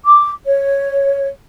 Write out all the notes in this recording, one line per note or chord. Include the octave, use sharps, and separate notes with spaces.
D6
C#5